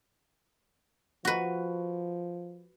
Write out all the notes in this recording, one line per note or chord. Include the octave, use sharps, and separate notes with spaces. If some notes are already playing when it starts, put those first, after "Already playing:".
F3 F#4 B4